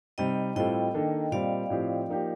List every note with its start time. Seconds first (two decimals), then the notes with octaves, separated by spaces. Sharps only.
0.18 C3 G3 C4 D#4 D#5 G5
0.56 A2 G3 C4 F4 A4 D#5 G5
0.94 D#3 A#3 D4 A4
1.32 A#2 G3 C4 D5 F5
1.70 A2 F3 C4 G4
2.08 F3 A#3 D#4 G4